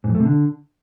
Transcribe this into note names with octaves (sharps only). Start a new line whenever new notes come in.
G#2
F2
A3
C3
D3